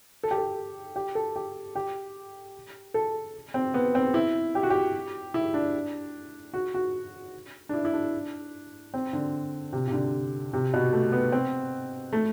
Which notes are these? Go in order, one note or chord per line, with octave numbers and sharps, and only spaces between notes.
A4
G4
A4
G4
A4
G4
G4
A4
C4
B3
C4
E4
G4
F#4
G4
E4
D4
F#4
F#4
D4
E4
E4
D4
C4
D3
C3
C3
D3
C3
B2
A3
B3
C4
A3